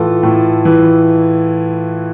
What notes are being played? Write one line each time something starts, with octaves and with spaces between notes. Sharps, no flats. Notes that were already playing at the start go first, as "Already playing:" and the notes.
Already playing: A2 E3 F4 A4
A2
E3